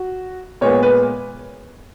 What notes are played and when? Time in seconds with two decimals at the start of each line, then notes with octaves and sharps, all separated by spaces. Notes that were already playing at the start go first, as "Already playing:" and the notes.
Already playing: F#4
0.61 A#2 G#3 B3 C#5
0.83 B4